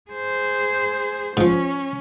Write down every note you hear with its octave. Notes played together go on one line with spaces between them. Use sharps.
G#4 C5
G#2 F3 C#4